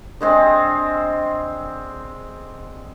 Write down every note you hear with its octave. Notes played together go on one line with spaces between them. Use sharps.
D3 G#3 C4